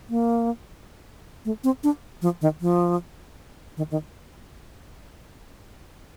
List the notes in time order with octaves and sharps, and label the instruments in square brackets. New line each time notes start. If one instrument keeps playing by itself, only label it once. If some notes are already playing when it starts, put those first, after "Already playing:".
[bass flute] A#3
A3
C4
D4
F3
D#3
F3
D#3
D#3